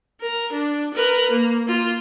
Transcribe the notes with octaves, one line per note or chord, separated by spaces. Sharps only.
A#4
D4
A#4 B4
A#3
A#3 F4